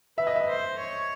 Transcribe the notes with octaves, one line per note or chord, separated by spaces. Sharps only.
B4 E5
D#5
E5
C5
C#5